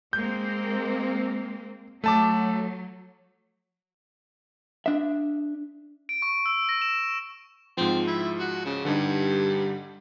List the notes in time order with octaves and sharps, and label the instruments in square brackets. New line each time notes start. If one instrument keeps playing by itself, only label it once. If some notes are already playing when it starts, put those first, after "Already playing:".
[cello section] G#3 A#3 C4 [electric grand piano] G6
[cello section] F#3 [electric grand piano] A3 A5 D6
[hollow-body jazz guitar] D4 E5
[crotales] D7
C#6
E6
A#6
E7
[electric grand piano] G#2 F3 [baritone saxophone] C4
[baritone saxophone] E4
F#4
C#3
[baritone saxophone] G2 [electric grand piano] D3 G3 D#4